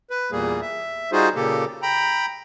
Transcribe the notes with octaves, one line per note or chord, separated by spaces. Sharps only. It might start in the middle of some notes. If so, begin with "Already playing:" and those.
B4
E2 A#2 G3 A#3 G#4
E5
G3 D#4 F4 F#4 G#4 C5
A#2 C#3 A#3 G4 A4
G5 A#5 B5